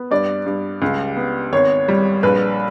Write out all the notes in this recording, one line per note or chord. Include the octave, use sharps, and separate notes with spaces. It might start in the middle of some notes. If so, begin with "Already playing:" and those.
Already playing: B3
G2 D5
G2
C#2
B3
G#1 C#5
G3
A#1 B4